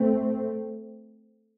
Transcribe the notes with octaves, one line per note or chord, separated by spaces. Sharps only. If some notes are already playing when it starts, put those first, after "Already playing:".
Already playing: A3 C4